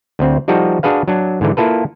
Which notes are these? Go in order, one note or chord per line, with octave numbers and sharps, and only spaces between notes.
D2 C4
F3 G3 D#4 F#4 A4
D4 F#4 G#4 B4 F5
F#3 D4
G#2 D3 E3
A#3 E4 F4 A4 B4